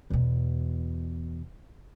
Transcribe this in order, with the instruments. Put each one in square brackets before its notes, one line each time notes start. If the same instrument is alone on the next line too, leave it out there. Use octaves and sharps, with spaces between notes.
[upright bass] E2 B2